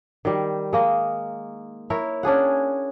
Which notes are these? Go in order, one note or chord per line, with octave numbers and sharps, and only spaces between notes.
D#3 G3
G#3 A#3 D#5
E4 A#4 C#5
C#4 D4 G#4 F#5